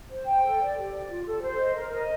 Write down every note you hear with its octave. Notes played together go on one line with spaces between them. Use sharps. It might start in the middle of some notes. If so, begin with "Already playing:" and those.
C5
G5
A4
D5
G4
D5
F4
A4
C5
D#5
A#4
D#5